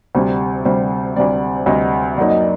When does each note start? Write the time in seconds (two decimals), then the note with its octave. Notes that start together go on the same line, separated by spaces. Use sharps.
0.15 D2 C3 G3 C5
0.65 D2 C3 G3 C5
1.16 D2 C3 G3 D5
1.66 D2 C3 G3 D#5
2.17 F#2 F#3 A#3 D#4 D5
2.29 D#5
2.41 D5